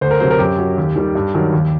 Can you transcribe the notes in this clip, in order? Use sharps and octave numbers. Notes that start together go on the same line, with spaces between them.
D2 C5
A#4
C3 F#3 C5
A#4
F#2 G4
F#3
D#2
D#3 G3
G2
D#3 F#3
D#2